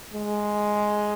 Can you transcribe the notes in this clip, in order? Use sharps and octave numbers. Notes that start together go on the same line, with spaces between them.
G#3